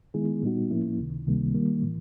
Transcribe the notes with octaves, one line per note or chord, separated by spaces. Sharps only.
D#3 G#3 B3 E4 G#4
A#2 G3 B3 D#4 F#4
A2 F3 A#3 C#4 E4
C#2 C3 D#3
C#2 C3 D#3 G3 A#3
D#3 G3 A#3
A2 E3